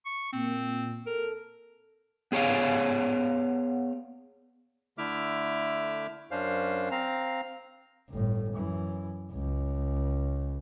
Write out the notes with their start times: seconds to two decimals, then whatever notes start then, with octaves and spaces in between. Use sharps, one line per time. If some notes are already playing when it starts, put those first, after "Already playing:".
0.06 C#6
0.33 A#2 C4
1.07 A4 A#4
2.32 B3 G#4 C#5 D5 F5
4.98 D3 A3 E4 E5 D6 F6
6.31 F#2 C#4 D4 C5 F5
6.91 C4 F5 A#5
8.10 G1 A2
8.54 F#2 E3
9.32 C#2